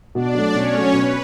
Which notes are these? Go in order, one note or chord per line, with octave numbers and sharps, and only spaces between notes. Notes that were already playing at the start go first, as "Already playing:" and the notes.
B2 D4 D5
F#3 A3
B2 C#4 C#5
F#3 A3
B2 B4